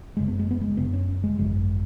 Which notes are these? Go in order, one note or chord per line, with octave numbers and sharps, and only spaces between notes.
F#1 F#2 C#3 G#3
B3
G#3
B3
G#3
F#1 F#2 C#3 B3
C#4
G#3
G#1 F#2 C#3 G#3